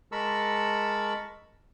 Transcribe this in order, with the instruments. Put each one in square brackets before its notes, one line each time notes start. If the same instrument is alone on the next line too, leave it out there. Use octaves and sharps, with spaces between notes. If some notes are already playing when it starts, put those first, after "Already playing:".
[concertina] G#3 A#4 A5 B5 C#6 E6